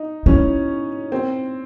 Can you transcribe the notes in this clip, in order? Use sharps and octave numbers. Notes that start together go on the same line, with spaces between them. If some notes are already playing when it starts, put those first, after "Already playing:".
Already playing: D#4
C#4 E4
C4